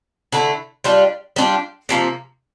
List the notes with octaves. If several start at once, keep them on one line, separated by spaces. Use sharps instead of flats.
D3 A3 E4
G3 D4 F4
G3 D4 F4
C3 F3 A#3